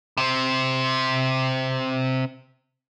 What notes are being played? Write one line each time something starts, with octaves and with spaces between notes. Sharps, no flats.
C3 C4